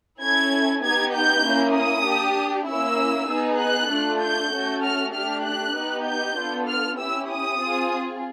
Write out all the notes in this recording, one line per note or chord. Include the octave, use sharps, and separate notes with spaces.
C#4 E4 A4 G#6
B3 D#4 G4 G#6
G6
A#3 C#4 E4
D#6
D4 G4
A#3 C#4 E4 E6
B3 D#4 G#4
F#6
A3 D4 F4 A4
G6
A3 C#4 F#4 A4
F6
A3 D4 G4 F6
F#6
B3 D#4 G4
G6
B3 D4 F4 A4
F6
C#4 E4 G4 E6
D#6
C4 F4 G#4